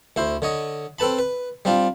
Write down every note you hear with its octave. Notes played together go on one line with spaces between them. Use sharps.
D2 E4 C5
D3 C#5 D#5
C4 A4 B4 A5 B5
B4
G3 C4 D4 F4